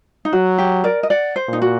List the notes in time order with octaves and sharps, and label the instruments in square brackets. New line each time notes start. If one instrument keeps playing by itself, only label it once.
[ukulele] D#4
[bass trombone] F#3 [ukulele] F#4
[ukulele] G4
A#4 D5
D#5
D5 F#5
C5
[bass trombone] A#2 [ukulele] D#4
[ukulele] F#4